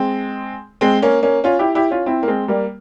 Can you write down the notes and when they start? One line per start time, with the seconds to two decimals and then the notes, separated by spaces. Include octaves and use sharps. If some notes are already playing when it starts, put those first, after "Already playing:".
Already playing: G#3 C4
0.81 G#3 C4
1.02 A#3 C#4
1.23 A#3 C#4
1.44 C#4 F4
1.59 E4 G4
1.75 E4 G4
1.91 C#4 F4
2.06 C4 E4
2.23 A#3
2.28 G#3 C4
2.48 G3 A#3